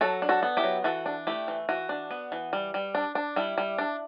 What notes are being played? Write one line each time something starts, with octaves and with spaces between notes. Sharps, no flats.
F#3 F#4 A4
D4
F#4 A4
B3
E4 G4
F#3
E3 F#4 A4
D4
A3 E4 G4
E3
E3 F#4
D4
B3
E3
G3
G3
D4
D4
G3 E4
G3
D4